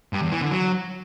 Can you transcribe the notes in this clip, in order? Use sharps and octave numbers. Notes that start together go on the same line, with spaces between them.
G2
E2
E3
D3
F#3